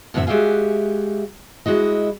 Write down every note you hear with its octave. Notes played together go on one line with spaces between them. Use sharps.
F#2 A2 D3 C4 E5
G#3 F#4 G4 E5 F5 G#5
G#3 E4 F#4 D#5